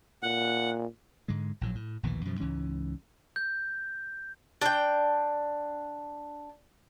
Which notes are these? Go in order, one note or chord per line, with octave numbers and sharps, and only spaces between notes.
A#2 F#5
G#2 D3 G#3
A#1 A2 F#3
A2
A#1 D#2 B2 E3
F#2 B2 F3
C#2 G#2 E3 C#4
G6
D4 G5